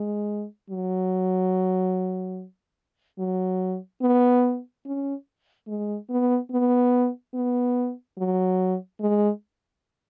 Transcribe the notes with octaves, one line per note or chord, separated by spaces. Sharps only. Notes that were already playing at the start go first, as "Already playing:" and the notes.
Already playing: G#3
F#3
F#3
B3
C#4
G#3
B3
B3
B3
F#3
G#3